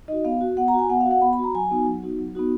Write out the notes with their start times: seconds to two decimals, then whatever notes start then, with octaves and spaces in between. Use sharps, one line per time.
0.08 D#4 F#4 D#5
0.25 B3 F5
0.41 F#4
0.57 B3 F#5
0.68 A#5
0.74 F#4 G#5
0.90 B3 F#5
1.01 F5
1.06 F#4
1.11 F#5
1.21 B3 B5
1.33 B5
1.39 F#4 A#5
1.55 F#3 G#5
1.71 B3 D#4 F#4
1.86 F#3
2.03 B3 D#4 F#4
2.19 F#3
2.35 B3 D#4 F#4